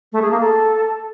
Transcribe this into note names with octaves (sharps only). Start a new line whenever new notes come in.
A3
G#4
A#3
A4